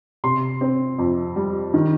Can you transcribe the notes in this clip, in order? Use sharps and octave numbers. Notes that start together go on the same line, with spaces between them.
C3 C6
C4
F2
G3
D#3